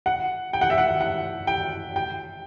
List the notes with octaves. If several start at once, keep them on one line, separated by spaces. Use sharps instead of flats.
F#5
G5
F#5
E5
F#5
F#5
G5
G5